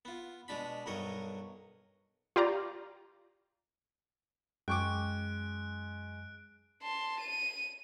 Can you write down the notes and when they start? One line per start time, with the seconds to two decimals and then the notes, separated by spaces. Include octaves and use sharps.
0.05 B3 F4
0.48 B2 G#3 D4 B5
0.86 B1 G2 F#3 A#4 C#5 D#5
2.36 F4 G4 D5 A#5
4.68 F#2 G#3 G5 C#6 D6 F#6 D7
6.83 A5 C6
7.20 D#7